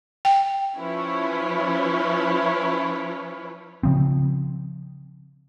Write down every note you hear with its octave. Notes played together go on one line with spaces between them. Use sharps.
G5
F3 C#4 E4 B4 C#5
C#3 F3 C4